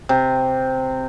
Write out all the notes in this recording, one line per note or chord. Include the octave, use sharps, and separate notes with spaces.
C3